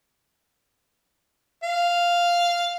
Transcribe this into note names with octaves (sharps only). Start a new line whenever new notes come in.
F5